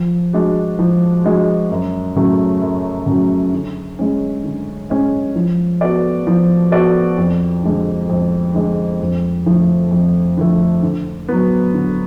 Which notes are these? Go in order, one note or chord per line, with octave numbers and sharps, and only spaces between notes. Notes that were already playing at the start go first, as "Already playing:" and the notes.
Already playing: F3
G#3 D4 F#4
F3
G#3 D4 F#4
F#2
C#3 F#3 A3
F#2
C#3 F#3 A3
D3
G#3 C#4
D3
G#3 C#4
F3
B3 F#4 A4 D5
F3
B3 F#4 A4 D5
F2
D3 G#3 D4
F2
D3 G#3 D4
F2
D3 F3 A3
F2
D3 F3 A3
D3
F#3 B3
D3